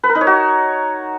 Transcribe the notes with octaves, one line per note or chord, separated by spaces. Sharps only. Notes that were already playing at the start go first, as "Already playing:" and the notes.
B4
A#4
D#4
C#5
F#4